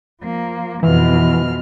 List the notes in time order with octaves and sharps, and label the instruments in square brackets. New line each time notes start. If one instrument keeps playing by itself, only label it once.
[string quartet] F3 A#3
[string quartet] F2 B2 F6 [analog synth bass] E3